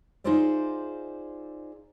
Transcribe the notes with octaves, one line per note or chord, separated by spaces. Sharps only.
D#4 F4 G#4 C5 D5 E5